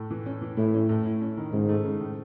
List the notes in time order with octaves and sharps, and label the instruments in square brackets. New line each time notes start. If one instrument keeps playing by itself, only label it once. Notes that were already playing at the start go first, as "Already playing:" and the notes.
Already playing: [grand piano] A2
E3
C#4
E3
[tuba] A2 [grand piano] E4
[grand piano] C#4
A2
E4
C#4
D#3
[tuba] G#2 [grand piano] C#3
[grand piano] A3
C#3
A2